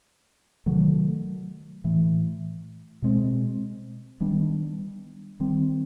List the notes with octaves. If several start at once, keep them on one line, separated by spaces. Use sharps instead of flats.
C3 D#3 F#3 A3
A2 E3 A3
B2 G#3 C4
D#3 G3 B3 D4
D#3 G3 C4